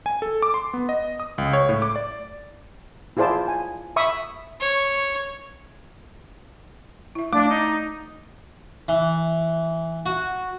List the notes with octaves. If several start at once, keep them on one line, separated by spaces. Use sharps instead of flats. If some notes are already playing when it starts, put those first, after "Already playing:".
G#5
A4
D6
C6
B3
D#5
D#6
C#2
C#5
A2
D6
D5
E4 F4 G#4 C5 D5 A5
G#5
E5 B5 C#6 D#6
C#5
E4 E5
A3 D4 D6
D#4
E3
F#4